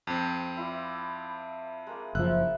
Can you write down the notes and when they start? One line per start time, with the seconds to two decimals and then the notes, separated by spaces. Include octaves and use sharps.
0.07 F2 C4
0.57 E4 F4 D5
1.87 G#3 A#3
2.15 F#1 F3 E5 F#5 F#6